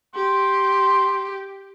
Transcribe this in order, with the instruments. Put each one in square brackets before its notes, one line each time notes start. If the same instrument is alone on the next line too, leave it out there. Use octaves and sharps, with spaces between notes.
[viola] G4 [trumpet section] C6